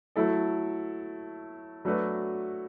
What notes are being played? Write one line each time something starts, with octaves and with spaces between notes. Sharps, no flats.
F#3 A3 E4 A4
F#3 A3 D4 F#4 B4